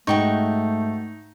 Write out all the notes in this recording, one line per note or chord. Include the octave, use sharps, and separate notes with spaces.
G#2 A3 D#4 F#4 G5 C#6